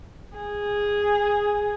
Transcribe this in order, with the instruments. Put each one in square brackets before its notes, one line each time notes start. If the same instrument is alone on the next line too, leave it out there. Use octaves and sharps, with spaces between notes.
[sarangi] G#4